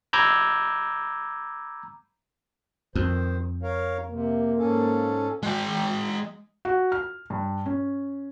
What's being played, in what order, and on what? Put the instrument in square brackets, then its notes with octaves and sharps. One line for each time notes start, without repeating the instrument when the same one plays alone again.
[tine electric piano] A#5 B5 D6 E6 G6 G#6
[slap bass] F2 [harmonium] D#3 C5
[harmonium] A#4 C#5 F5
[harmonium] C3 [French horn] A#3
[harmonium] G#2 C#4 A4
[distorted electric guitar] G#3 G5
[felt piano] F#4
F6
G2
C#4